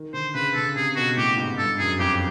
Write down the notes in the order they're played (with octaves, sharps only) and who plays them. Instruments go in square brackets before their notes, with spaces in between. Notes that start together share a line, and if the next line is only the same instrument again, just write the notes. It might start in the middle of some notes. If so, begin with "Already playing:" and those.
Already playing: [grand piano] D#3
[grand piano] D3 [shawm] C5
[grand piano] C#3 [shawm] B4
[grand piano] C#3 [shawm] A4
[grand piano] C3 [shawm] G#4
[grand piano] B2 [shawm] F#4
[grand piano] A2 [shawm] G4
[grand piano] G#2
[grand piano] G2 [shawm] A4
[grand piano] F#2 [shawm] G#4
[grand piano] F2 [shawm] G4